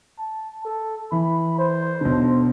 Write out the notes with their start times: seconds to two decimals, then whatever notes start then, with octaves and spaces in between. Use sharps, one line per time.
0.19 A5
0.65 A4
1.12 E3 B5
1.59 C5
2.01 B1 D3